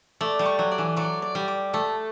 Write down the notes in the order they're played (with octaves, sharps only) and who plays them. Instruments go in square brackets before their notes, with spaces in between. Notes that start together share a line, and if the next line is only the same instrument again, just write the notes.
[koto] A3 [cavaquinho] D5
[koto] G3
[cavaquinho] C#6
[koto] F#3
[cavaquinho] D5
[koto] E3
[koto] F#3 [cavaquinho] D5
[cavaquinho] D5
[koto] G3
[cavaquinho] D6
[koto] A3 [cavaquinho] A4